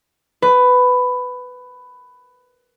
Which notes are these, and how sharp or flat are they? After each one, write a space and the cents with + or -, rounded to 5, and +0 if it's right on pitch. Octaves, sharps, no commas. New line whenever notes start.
B4 +15